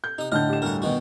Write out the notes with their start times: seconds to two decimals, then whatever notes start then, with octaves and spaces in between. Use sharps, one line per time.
0.04 G6
0.18 C3 D#4 D#6
0.32 A2 D3 D#5 A5 F6 G6
0.49 G4 E7
0.62 D2 G2 A#4 F#5
0.82 B2 D#3 F#4